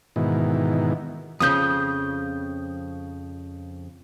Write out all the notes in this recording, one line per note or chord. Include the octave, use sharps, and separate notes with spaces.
G#2 B2 D#3 E3
F2 C#3 F3 D#6 G6